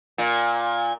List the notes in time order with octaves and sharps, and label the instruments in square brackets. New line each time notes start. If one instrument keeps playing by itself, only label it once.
[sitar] A#2